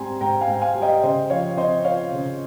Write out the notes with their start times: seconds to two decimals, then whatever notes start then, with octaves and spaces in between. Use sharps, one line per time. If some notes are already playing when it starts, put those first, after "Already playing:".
Already playing: G#2 G3 C4 G5 G#5 A#5 C6
0.21 G#2 G5 A#5
0.41 F5 G#5
0.48 G#2
0.61 F5 G#5
0.75 G3
0.82 D#5 G5
1.02 C#3 C5 D#5
1.30 F3 C#5 F5
1.57 C4 C5 D#5
1.85 F4 C#5 F5
2.12 C#3